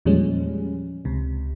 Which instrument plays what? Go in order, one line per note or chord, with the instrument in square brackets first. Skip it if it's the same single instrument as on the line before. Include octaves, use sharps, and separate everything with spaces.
[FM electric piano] E2 A#2 F3 G3 G#3 C#4
C#2 C3